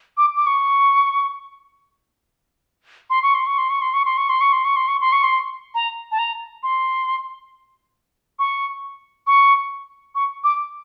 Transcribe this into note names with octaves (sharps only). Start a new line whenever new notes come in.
D6
D6
C#6
C6
C#6
C6
C#6
C6
C#6
C6
C#6
C6
C#6
C6
C#6
C6
C#6
C6
C#6
C6
C#6
C6
A#5
A5
A#5
C6
C#6
C#6
C#6
D6